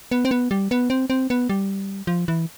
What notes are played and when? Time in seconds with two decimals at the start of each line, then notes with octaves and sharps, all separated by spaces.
0.11 B3
0.25 C4
0.31 B3
0.51 G3
0.71 B3
0.90 C4
1.10 C4
1.30 B3
1.49 G3
2.07 F3
2.28 E3